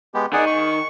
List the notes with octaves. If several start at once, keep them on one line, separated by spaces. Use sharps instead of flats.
G#3 B3 G4
D#3 D#4 G#4 D5 F#5
C#6